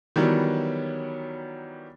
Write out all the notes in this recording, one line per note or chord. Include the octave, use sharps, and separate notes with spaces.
D#3 E3 F#3 G3 B3